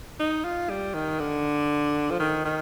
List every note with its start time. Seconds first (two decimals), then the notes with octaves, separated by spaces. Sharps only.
0.20 D#4
0.44 F4
0.70 G3
0.94 D#3
1.19 D3
2.10 F3
2.19 D#3
2.45 D#3